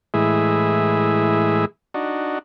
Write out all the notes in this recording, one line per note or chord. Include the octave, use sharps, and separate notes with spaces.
A2 E3 G#3 G#4 E5
D4 D#4 F#4